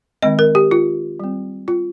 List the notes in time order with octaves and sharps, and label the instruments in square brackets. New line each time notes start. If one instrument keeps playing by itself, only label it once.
[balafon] D#3 G#3 C4 D#5
A#4
G4
F4
G3 C4
F4